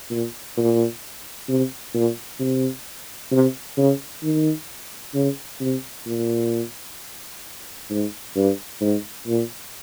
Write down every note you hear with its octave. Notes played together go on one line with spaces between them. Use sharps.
A#2
A#2
C3
A#2
C3
C3
C#3
D#3
C#3
C3
A#2
G#2
G2
G#2
A#2